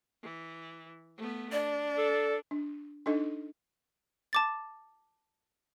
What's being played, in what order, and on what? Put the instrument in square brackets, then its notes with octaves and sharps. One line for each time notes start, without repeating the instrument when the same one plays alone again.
[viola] E3
A3 B3
[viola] D4 [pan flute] D5
[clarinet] A4
[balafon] D4
D4 D#4 A4 D#5
[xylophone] A5 D6 A6